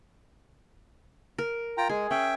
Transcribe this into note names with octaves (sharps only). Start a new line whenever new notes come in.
A#4
F4 G5 A#5
G#3 G#4
C#4 E5 G5